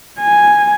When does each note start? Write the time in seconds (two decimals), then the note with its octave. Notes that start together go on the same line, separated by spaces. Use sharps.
0.20 G#5